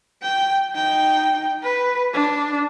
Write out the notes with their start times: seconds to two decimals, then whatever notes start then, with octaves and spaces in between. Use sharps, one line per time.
0.23 G5
0.73 D#4 G5
1.63 B4
2.14 D4